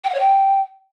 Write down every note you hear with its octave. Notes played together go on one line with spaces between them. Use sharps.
G5
F#5
C#5
G5